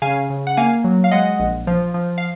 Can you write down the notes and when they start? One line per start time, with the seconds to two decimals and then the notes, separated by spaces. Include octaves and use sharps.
0.02 C#3 F5 G#5
0.30 C#3
0.47 F#5
0.57 A#3 F5 G#5
0.84 F#3
1.04 F5
1.11 G#3 D#5 F#5
1.40 A#1
1.67 F3
1.94 F3
2.18 F5